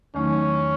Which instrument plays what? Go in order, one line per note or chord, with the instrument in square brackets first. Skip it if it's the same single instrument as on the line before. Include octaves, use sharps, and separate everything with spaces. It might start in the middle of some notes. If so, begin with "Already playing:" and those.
[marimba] E2 D#3 F#3 A3 D#4 [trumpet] C#4